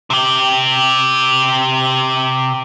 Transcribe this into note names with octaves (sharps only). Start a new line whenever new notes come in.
C3 G4